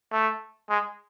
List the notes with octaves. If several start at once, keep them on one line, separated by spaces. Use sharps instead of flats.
A3
G#3